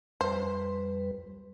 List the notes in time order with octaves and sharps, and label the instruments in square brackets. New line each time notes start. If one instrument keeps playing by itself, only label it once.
[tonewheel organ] F2 G3 B4 [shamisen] C5